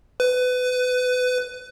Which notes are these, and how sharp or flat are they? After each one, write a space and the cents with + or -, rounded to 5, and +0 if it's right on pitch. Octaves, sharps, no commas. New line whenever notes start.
B4 +25